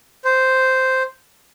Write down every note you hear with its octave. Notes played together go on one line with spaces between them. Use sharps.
C5